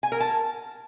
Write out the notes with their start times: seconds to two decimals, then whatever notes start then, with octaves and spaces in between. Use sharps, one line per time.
0.03 G#5
0.12 A#4
0.20 A5